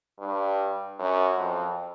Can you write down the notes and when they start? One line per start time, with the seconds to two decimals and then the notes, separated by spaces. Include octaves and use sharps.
0.19 G2
0.99 F#2
1.38 F2